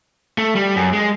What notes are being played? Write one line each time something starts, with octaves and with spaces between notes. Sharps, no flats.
A3
G3
F#2
G#3